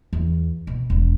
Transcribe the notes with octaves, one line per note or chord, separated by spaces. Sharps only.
E2
B2
E1